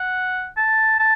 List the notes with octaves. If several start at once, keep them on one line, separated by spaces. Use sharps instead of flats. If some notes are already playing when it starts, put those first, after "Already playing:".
Already playing: F#5
A5
A5